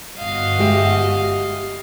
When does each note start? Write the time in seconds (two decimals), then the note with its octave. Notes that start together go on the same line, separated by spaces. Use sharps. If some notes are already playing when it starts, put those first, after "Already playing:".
0.18 G1 F#4 D#5 F5
0.59 G#3 G4 E5